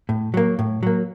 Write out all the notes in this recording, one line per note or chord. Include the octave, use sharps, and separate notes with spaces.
A2
F#3 A#3
A2
F#3 A#3